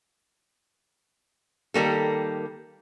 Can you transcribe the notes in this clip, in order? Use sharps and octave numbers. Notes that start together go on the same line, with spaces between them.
D#3 G3 A#3 A4